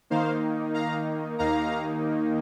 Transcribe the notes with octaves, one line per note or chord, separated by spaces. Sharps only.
D#3 A#3 D#4 C5 F5
F5 A#5
D#2 D#3 A#3 D#4 F5 A#5